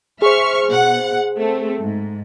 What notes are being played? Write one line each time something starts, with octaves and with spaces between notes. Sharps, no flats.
G#4 C5 E5 C#6 F6
B2 F#5
A3 C4
G#2